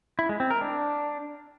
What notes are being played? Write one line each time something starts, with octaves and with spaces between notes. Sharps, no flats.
E4
G#3
C4
A#4
D4